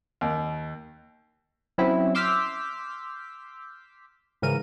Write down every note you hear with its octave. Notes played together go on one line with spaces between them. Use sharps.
D#2
F#3 C4 C#4 E4
C6 D6 E6 F6 G6 B6
G#2 C#3 E3 A#4 D#7